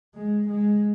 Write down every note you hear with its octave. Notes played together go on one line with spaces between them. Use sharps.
G#3
G#3